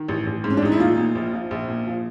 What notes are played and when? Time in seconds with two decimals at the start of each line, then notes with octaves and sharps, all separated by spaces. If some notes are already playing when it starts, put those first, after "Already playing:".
Already playing: D#3
0.08 A1
0.26 A1
0.44 G#2
0.50 C#4
0.57 D4
0.62 A1 D#4
0.72 E4
0.79 A#2 D#4 F4
0.97 A#2
1.15 A#1
1.33 F3
1.51 A#1
1.68 A#2
1.87 F3